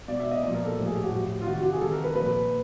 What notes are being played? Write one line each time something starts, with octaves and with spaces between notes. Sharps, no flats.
B2 D5
E5
D#5
A#2 F3 D5
A#4
A4
A2 F3
G#4
G4
F#4
A2 F3
F4
C3 D#3 F#4
G4
F#4
G#4
C3 D#3 A4
A#4
B4
A#2 F3 B4